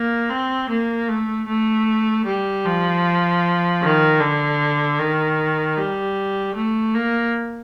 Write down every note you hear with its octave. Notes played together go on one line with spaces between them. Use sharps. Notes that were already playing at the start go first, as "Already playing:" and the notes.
Already playing: A#3
C4
A#3
A3
A3
G3
F3
D#3
D3
D#3
G3
A3
A#3